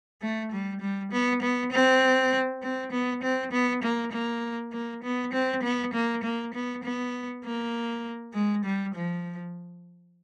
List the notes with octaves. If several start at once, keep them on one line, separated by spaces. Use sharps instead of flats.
A3
G3
G3
B3
B3
C4
C4
B3
C4
B3
A#3
A#3
A#3
B3
C4
B3
A#3
A#3
B3
B3
A#3
G#3
G3
F3